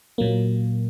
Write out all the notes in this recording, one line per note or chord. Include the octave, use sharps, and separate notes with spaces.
A#2 F#3 A#3